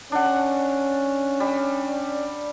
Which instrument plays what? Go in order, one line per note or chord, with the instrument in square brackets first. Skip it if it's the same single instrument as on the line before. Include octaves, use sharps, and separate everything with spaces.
[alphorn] C#4 [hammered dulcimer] D4 F#5
[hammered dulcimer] G3